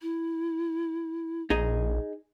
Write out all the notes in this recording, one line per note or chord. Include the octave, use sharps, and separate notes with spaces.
E4
A#1 D#4 G#4 D#5